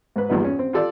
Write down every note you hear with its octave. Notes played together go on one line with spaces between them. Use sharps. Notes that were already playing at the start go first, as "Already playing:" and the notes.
G#2 B4
A#1 E2 G2 A#2 B3 D#4
C#4
C4
F4 G4 A4 D5